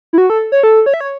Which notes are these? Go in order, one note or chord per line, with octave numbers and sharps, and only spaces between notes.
E4
F#4
A4
C#5
A4
C#5
E5
C#5